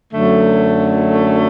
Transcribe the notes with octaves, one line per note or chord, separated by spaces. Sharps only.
F#2 D3 F#3 A3